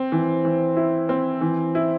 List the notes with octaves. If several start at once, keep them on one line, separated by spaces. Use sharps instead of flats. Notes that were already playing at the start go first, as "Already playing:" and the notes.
Already playing: C4
E3
E3
E4
C4
E3
E4